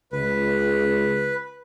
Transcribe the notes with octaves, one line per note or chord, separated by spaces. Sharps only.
C#2 B4